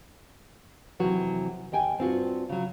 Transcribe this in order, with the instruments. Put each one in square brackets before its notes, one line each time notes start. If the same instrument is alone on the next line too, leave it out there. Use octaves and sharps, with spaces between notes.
[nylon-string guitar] F2 C3 E3 F#3 F#4
D#2 D#5 G5 G#5
G2 C4 F4 F#4
C#3 F#3